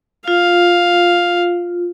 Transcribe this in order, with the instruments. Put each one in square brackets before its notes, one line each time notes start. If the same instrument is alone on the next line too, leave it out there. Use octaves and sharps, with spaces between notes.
[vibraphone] F4 [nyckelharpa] F5